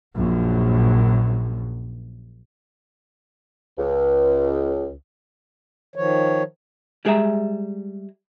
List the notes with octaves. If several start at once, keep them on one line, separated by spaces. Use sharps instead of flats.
A#1 F#2
C#2
D#3 F3 C#5
G3 G#3 G#4 C#5 E5 A#5